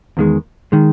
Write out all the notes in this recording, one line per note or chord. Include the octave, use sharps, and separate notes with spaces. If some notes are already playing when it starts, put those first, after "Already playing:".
E2 D#3 G#3
D#3 G#3